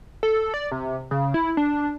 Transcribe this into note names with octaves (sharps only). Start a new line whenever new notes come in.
A4
D5
C3
C#3
E4
D4